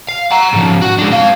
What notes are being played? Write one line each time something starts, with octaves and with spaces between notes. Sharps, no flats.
F5
F#5 A#5
G#2 F3
F#4
G#3 D4
C4 F5